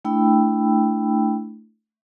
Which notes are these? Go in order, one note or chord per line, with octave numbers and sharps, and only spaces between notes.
A3 D4 E4 G5 B5 E6